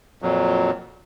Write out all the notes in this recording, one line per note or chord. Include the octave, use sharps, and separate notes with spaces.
F2 A#2 F#3